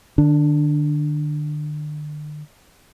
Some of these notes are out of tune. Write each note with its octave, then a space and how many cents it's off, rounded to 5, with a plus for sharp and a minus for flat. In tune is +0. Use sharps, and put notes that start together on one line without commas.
D3 +40 D4 +0